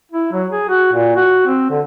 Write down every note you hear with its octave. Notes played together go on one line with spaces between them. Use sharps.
E4
F#3
G#4
F#4
A#2
F#4
C4
D3